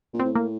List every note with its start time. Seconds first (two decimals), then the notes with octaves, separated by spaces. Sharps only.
0.14 A#2
0.20 C4
0.25 A2
0.35 A#3